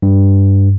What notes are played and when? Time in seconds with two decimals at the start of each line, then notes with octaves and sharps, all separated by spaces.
0.02 G2